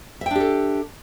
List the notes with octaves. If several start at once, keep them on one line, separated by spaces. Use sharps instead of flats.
D4 G4 A4 E5 G5